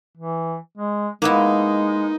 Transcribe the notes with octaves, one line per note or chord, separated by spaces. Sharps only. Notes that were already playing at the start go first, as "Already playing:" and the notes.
E3
G#3
G#3 A#3 B3 D#4 E4